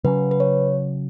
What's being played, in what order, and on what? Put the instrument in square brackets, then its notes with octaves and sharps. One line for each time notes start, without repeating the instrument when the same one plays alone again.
[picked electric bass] C#3 F#3 C#4 [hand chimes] B4
[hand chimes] B4
C#5